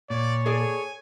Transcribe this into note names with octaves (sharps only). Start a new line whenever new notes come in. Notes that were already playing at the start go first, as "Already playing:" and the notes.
A#2 C#5 D5
G#4 A4 D5 G#5